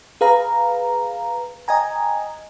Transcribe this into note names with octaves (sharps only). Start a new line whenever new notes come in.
G#4 B4 F5 A#5
D#5 G5 G#5 A#5